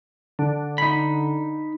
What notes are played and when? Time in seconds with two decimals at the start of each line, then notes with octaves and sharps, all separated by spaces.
0.39 D3
0.78 D#4 B5